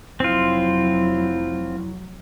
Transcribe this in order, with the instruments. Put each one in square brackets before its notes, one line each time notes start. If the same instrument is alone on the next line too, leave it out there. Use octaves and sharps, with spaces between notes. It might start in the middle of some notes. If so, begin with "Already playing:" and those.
[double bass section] F1 F#3 [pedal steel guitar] C4 F4 [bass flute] E4